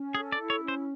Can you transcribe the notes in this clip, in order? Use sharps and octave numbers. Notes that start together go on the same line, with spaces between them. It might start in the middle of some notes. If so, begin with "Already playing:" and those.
Already playing: C#4
G#4 A4
D5
E4
C#5
C#4
C5